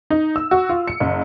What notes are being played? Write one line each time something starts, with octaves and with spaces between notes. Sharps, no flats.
D#4
E6
F#4
F4
C#7
F#1